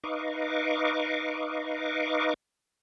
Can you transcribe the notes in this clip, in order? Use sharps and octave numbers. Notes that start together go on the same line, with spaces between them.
D#4 B4 D#5 F5 C#6 D6